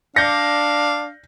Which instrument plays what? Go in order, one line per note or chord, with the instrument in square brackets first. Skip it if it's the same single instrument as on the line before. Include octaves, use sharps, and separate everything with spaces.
[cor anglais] D4 [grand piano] D5 G6 C#7 [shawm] F5 [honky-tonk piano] A#6